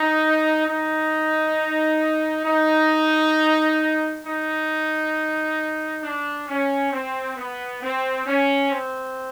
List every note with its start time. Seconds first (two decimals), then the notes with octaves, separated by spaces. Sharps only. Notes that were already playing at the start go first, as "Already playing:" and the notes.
Already playing: D#4
0.66 D#4
2.45 D#4
4.24 D#4
6.03 D4
6.48 C#4
6.92 C4
7.37 B3
7.81 C4
8.26 C#4
8.71 C4